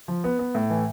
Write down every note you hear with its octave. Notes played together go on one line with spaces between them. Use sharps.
F3
B3
B3
A2
E3